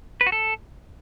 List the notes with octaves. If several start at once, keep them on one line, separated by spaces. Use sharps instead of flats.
B4
F#4
A4